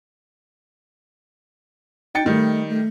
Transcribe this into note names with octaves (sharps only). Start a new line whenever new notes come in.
D#4 G5 A6 C#7
D#3 G3 A3
A3